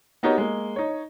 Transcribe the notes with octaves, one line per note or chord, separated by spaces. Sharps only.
B3 D#4 F#4 G4 A#4 C#5
G#3 A#3
D#4 C#5